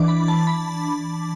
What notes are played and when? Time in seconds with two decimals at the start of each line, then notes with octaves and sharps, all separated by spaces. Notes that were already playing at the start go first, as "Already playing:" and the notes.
Already playing: E3 D4 D6
0.08 B5
0.28 A5
0.47 B5